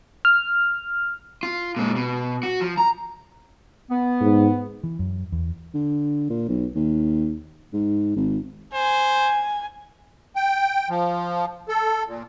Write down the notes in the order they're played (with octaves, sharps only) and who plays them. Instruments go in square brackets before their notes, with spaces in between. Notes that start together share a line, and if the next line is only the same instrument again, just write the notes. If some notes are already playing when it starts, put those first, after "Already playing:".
[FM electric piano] F6
[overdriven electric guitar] F4
A#2 G#3
B2
F#4
F3
A#5
[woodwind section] B3
[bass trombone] G#2
[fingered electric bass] E3
F#2
E2
[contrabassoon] D3
A#2
B1
D#2
G#2
G#1
[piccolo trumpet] C5 [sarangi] G#5
[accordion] G5
F3
A4
A#2